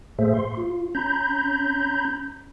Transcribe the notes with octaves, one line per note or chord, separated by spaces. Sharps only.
A2 A3 A#3 G#4 C5 E5
C6
F4
C#4 A#5 B5 G6